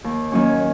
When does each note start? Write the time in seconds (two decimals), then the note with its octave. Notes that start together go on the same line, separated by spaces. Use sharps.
0.04 D#2
0.32 D#3 F#3 A#3 C#4